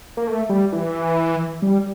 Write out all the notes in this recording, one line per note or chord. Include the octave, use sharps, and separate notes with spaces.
A#3
A3
G3
E3
G3